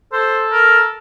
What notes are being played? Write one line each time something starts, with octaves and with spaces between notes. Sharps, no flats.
A4 C5
A#4